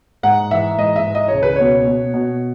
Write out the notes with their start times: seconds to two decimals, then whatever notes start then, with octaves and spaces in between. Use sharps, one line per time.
0.23 G#2 F#5
0.51 E3 E5
0.78 G#2 D#5
0.96 E5
1.06 E3
1.15 D#5
1.28 C#2 C#5
1.43 B4
1.56 B2 C#5
1.87 B2
2.14 B2